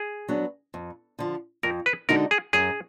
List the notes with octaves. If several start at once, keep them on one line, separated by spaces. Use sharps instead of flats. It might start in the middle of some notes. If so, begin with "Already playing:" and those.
Already playing: G#4
F#3 B3 D4
F2
D3 F3
F2 A#4
B4
D3 G#3 D#4 F#4 A#4
G#4
F#2 G#4